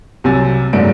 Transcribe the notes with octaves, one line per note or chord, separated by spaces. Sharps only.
C2 C3 F#3 G#5 E6 A6
F#1 G#2 F#3 A3 D4 D7